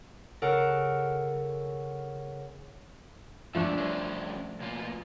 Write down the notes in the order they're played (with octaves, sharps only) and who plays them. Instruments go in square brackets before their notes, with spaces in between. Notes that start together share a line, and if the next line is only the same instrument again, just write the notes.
[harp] C#3 A4 A#4 F#5
[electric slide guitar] B2 G#3 E5 [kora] F3 A3 D4
[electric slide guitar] G3 C#4 C5
B2 A#3 F4